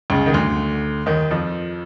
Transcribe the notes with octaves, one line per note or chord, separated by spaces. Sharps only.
C#2 C#3
D#3
D2 D3
D#2 D#3
F2 F3